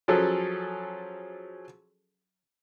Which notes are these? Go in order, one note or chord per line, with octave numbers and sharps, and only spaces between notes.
F3 F#3 C#4 G#4 A4